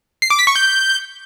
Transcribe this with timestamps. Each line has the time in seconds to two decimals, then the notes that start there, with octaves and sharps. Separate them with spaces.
0.22 C7
0.30 D6
0.39 B6
0.47 C#6
0.56 G6